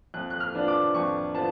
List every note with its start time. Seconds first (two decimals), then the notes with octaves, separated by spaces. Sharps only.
0.14 F2 F#6
0.30 F#6
0.40 F6
0.54 F3 B3 D4
0.68 D6
0.94 F2 C#6
1.35 F3 B3 A5